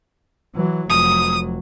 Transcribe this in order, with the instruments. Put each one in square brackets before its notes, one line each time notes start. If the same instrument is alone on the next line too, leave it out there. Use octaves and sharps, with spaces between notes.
[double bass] E3 F#3
[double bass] F1 F#3 [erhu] D#6